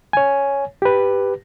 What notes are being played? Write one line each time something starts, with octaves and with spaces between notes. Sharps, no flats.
C#5 G#5
G4 B4